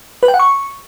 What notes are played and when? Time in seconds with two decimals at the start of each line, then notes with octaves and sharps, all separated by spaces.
0.23 B4
0.28 G5
0.34 F#5
0.39 C#6